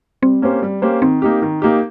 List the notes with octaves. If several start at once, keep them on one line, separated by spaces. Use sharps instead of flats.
G3 C4
A#3 C#4 G4 C5
G3
A#3 C#4 G4 C5
D#3 C4
A#3 D#4 G4
D#3
A#3 D#4 G4